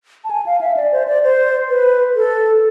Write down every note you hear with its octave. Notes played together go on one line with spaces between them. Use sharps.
A5
G#5
F5
E5
D5
C5
D5
C5
B4
A4